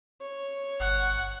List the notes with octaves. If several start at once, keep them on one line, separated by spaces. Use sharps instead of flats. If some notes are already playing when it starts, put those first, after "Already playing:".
C#5
G1 F#5